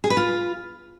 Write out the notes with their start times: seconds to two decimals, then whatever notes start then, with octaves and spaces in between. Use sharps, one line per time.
0.04 G#4
0.10 B4
0.17 F4